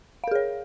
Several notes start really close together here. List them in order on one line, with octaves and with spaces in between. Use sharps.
F5 A#4 G#4 C#5